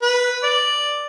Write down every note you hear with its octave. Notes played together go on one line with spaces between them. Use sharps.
B4
D5